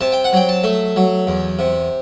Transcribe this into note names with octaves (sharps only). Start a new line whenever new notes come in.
C3 A5
G5
F#5
F#3 G5
A5
A3
F#3
E2
C3